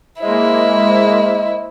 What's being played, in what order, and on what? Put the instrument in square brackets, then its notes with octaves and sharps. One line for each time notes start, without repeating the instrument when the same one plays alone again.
[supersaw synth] G#3 A#3 [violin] E4 [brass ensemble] C5 D#5